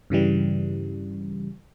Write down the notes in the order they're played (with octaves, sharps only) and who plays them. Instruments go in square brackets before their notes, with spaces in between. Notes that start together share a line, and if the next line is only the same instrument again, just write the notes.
[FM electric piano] G2 C#3 E3 G3